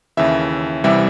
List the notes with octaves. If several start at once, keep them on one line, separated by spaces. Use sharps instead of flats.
D#2 C#3 E3 E5
C2 C3 E3 G3 E5